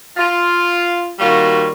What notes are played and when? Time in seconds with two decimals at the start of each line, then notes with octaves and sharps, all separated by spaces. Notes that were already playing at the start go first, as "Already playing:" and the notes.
0.17 F4
1.20 D#3 G3 A#3 F4 F#4 C#5